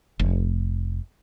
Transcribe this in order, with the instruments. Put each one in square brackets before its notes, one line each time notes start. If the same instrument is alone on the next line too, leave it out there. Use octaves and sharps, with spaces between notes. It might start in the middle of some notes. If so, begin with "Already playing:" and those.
[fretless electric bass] F1